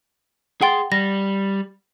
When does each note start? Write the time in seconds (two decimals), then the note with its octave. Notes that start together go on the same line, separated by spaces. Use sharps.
0.61 G#4 F#5 G5 C6 A6
0.92 G3 A#6